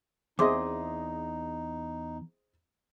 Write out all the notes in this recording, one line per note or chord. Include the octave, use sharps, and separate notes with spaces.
E2 C4 D#4 G#4 D#5 E5 C6 D6